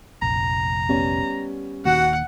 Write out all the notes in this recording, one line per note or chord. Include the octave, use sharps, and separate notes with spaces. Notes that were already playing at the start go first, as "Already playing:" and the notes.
F1 A#1 A#5
G3 B3 C#4
D#1 D#3 A#3 F#4 F#5